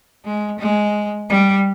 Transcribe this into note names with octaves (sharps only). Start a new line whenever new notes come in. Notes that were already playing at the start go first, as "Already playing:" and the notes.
G#3
G#3
G3